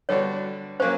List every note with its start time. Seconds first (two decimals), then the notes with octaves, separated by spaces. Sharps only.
0.09 D3 G3 B3 D4 F#4 C#5
0.80 F#3 A#3 C#4 C5